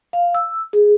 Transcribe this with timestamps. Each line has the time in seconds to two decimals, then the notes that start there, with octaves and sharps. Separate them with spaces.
0.13 F5
0.35 E6
0.73 G#4